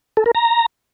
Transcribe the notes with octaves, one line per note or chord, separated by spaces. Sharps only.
A4
A#4
A#5